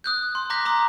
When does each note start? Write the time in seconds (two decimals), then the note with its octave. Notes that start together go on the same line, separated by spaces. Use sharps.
0.04 D#6 F#6 G6
0.35 C6
0.50 A#5 D6 F#6 G6 A#6 B6
0.65 A#5 C6 D#6